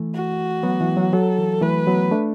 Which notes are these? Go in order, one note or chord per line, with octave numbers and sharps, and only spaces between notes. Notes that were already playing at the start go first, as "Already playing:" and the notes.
Already playing: E3 A3
F#4
F#3 B3
E3
F#3
F#3 A4
E3
E3 A3 B4
F#3 B3
A3 D4